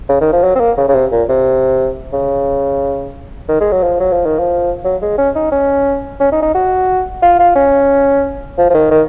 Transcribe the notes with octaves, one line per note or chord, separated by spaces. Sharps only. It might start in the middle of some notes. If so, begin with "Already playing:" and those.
C#3
D#3
F3
F#3
C4
A#3
C#3
C#3
C3
A#2
C3
C#3
D#3
G#3
F#3
F3
F#3
F3
D#3
F3
F#3
G#3
C#4
D#4
C#4
C#4
D#4
D#4
F#4
F4
F4
C#4
F3
F3
D#3
D#3